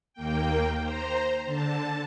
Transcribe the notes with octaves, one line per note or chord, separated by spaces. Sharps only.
D#2 A#3 G5
C5 A#5
D3 A5